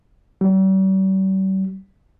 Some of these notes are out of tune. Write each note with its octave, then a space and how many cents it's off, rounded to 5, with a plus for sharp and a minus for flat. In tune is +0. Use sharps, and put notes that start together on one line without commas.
G3 -45